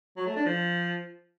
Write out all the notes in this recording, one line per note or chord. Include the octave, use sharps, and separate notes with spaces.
F#3
A3
D4
F3